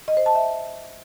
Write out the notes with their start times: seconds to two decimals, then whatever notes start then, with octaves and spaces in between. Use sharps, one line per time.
0.08 D#5
0.17 C5
0.26 A5
0.35 E5